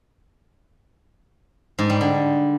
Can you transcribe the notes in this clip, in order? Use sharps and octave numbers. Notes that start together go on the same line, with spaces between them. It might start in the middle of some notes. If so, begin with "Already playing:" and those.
G#2
G3
D3